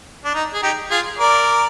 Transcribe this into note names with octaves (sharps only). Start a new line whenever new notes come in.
D4
D#4
G#4
D#4 G4
F4 G#4
A#4 D5